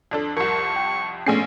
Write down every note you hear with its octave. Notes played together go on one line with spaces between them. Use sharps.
F2 D4 A4
C2 F2 A#4 C#6
G5
A#1 A3 B3 C#4 G#4 C7